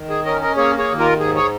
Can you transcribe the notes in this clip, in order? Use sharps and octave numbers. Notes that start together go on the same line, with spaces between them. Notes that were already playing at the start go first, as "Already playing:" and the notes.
Already playing: D#3
G#4
C#4 A#4 D#5
A#4 D#5
A#3 G#4 C#5
G#4 C#5
D#2
F4 A#4
G#2 G#4
G#4 C#5